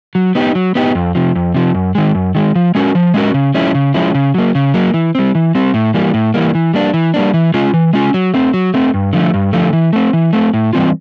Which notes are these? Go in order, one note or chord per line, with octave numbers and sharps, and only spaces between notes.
F#3
B3 D#4 G4
F#3
B3 D#4 G4
F2
C3 F3
F2
C3 F3
F#2
D#3 G#3
F#2
D#3 G#3
F3
G#3 C#4 F#4 A#4
F3
G#3 C#4 F#4 A#4
C#3
F3 G#3 C#4 E4
C#3
F3 G#3 C#4 E4
C#3
F#3 A#3
C#3
F#3 A#3
E3
G3 C4
E3
G3 C4
A2
E3 G3 A#3
A2
E3 G3 A#3
E3
G3 A#3 D4
E3
G3 A#3 D4
E3
G#3 C#4 F4
E3
G#3 C#4 F4
F#3
A3 C4
F#3
A3 C4
G2
D3 F3 A3
G2
D3 F3 A3
E3
A3 C4
E3
A3 C4
A2
E3 G3 C4 F4